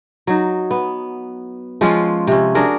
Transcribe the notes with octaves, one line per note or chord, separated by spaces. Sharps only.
F#3 D#4
B3
F3 G#3 C#4 F4
C3 C#4
D4 F#4 G#4 A#4